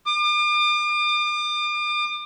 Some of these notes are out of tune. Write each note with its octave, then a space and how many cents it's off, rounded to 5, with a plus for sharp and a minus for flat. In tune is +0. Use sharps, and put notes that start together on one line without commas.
D6 +40